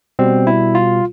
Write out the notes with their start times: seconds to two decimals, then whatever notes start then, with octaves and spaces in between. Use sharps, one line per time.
0.19 B2 G3 C4
0.47 E4
0.75 F4